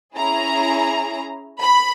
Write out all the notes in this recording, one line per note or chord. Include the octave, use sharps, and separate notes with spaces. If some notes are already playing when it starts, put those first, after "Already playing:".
C#4 E4 G#4 A#5
B5